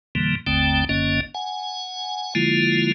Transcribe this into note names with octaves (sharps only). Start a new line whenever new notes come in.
F2 B2 D3 E3 G3 A#3
G1 D#2 D3 A3 C4 G5
F#1 F#2 D3 A#3 C#4 D#5
F#5 G#5
D3 F3 G#3 A#3 E4 F4